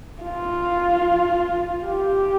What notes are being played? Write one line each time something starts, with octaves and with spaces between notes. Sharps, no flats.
F4
G4